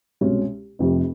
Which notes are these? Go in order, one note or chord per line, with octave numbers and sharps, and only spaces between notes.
C2 B2 G#3 C#4
F1 F2 C3